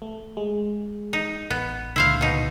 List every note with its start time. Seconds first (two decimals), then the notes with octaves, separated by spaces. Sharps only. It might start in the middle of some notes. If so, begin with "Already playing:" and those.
0.02 A3
0.37 G#3
1.13 D#4
1.50 A1 B3
1.96 C#2 A#2 D3 E4 C5 F5
2.21 B2 D#4